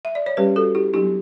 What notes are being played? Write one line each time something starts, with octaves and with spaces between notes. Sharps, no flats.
E5
D5
C#5
G3 C#4 G4 B4
F#4 A4
E4 G4
F#3 B3 D4 E4 G4